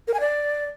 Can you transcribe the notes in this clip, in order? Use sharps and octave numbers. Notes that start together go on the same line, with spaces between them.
A#4
G#5
D5